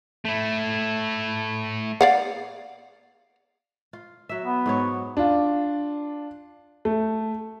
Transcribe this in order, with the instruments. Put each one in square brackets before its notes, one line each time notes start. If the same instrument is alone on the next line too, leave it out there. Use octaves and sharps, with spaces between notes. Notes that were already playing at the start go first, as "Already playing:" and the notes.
[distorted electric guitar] A3 E4
[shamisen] D5 F5 F#5
[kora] F4
F#3 E5
[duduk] B3
[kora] G#2 F#3 C#5
[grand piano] D4 F4
A3